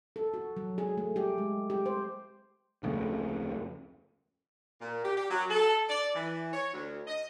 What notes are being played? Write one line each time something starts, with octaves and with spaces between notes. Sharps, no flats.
A4
F#4
F#3
G#4
A3
G4
G#3
G4
C5
D1 F2 C#3 A3
A#2
G4
G4
F#3
A4
D5
E3
C#5
D2
D#5